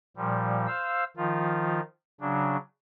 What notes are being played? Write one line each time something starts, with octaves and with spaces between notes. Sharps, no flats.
A#2 F3 G3
C5 F5 E6
D#3 F3 F4
C#3 F#3 D4